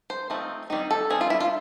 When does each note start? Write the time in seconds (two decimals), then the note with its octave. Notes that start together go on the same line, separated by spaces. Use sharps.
0.10 C5
0.30 F3 A3 C4 D#4
0.70 D#3 G3 C4 D#4
0.91 A4
1.10 D#3 G3 C4 G#4
1.21 F4
1.30 E4
1.40 F4